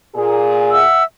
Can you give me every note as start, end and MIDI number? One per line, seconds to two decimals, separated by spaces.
0.15 0.84 46
0.15 0.84 68
0.71 1.03 76
0.71 1.03 78
0.71 1.03 88